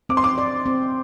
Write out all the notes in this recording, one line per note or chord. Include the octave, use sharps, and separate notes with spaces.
C4 D6
C6
D6
D5
C4